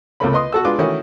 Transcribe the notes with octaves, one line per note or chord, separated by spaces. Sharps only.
C#2 C3 A3 A#3 C#4 B5
B4 D#5 C6 D#6
F#4 A4 E6
G#3 D4 F4 B4 D6
D#3 E3 A3 C#4 F#4